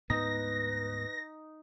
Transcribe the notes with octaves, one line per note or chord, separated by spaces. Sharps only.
D2 G#2 B3 D#4 B4 A#6